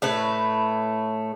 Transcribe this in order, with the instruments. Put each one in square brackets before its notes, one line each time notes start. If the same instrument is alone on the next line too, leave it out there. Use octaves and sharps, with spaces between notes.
[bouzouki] A2 A3 B4